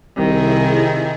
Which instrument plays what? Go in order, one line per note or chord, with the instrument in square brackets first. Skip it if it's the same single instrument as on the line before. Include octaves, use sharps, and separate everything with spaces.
[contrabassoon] C2 [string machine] C3 E4 G#4 [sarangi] D#3